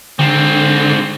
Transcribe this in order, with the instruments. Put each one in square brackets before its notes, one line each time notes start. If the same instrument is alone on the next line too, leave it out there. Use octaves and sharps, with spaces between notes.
[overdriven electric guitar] G#2 C4 [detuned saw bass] D3